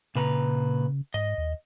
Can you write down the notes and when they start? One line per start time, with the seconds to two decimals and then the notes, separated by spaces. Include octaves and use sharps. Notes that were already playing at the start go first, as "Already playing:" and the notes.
0.15 A#2 C#3 B4 A#5
1.14 G#2 D#5
1.38 D#2